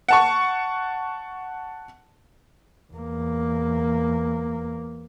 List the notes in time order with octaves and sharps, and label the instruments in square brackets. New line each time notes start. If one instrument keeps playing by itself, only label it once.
[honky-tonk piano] F#5 A5 C#6
[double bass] E2 A#3